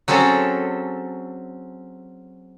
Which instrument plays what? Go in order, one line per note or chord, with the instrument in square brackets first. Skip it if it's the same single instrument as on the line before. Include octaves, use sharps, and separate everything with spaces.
[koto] F#3 C4 C#4 G#4 A4